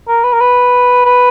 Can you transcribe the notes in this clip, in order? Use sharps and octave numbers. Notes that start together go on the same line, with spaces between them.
A#4
B4
A#4
B4
B4